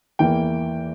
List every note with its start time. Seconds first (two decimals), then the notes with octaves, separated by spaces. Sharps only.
0.19 E2 E3 A#3 G5